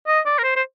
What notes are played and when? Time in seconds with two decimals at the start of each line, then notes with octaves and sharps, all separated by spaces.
0.07 D#5
0.25 D5
0.39 A#4
0.44 C5
0.56 C5